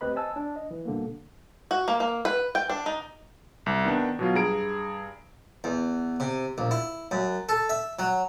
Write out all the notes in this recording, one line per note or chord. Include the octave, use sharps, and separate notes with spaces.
D2 C4 G4 B4 D#5 B5
C5 D#5 G#5 A5 E6
D4
D#5
E3
B2 D3 G3 A#3
F#4
A#3
A#3
B4
G5
D4
D#4
C2
D#3 B3 D4
B2 F#3 F4
G2 G#4 A#5 D7
E2
C3
A#1
E4
F#2
A4
E5
F#3